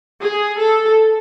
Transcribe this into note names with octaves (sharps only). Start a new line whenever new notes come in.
G#4
A4